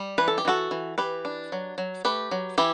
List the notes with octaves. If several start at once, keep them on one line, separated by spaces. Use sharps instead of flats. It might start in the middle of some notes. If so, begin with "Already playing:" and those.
Already playing: G3
E3 B4
A4
G4
E3 F#4 A4
E3
E3 G4 B4
D4
F#3
F#3
A3 G4 B4
F#3
E3 E4 G4